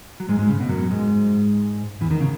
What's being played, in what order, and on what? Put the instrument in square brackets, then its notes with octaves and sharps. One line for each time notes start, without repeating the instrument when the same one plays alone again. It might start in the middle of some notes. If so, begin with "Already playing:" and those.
[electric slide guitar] F#3
G#2 G#3
G#2 G#3
C#3
B2
F#2 F#3
G#2 G#3
E2 E3
D#3
C#3